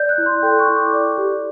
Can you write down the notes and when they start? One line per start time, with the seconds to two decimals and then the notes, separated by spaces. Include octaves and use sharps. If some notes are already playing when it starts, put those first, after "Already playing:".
Already playing: D5 G6
0.09 F#6
0.18 E4
0.26 C6
0.43 A4 G5
0.59 C#6
0.68 E4
0.76 D6
0.93 D5
1.18 G4